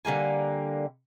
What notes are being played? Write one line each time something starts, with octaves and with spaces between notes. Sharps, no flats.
D3 G3 A#3 G#5